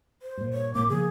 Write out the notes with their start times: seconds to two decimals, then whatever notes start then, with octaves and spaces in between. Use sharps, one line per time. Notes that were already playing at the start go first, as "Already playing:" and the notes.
0.22 C5
0.37 G2 A#2
0.53 C#5
0.74 G#1 A2 A#3 D6
0.89 C#3 F3 A#3 G#4